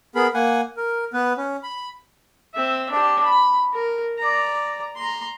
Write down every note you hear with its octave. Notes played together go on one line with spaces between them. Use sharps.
B3 G#4 A#4 B5
A#3 F#5 G#5
A#4
B3 B4
C#4
B5
C4 E5
D4 G4
B5
A#4
D5 A#5
A#5 C6